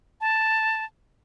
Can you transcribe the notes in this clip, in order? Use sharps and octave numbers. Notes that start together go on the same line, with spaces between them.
A5